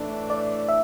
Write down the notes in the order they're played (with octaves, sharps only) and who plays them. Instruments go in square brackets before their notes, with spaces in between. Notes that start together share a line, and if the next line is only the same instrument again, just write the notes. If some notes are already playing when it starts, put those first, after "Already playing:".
Already playing: [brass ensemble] A2 E3 A3 D4
[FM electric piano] D5
E5